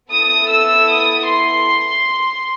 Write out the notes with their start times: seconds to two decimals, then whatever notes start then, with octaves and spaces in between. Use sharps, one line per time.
0.10 B3 E4 A4 D#6
0.49 E6
0.89 D#6
1.28 C6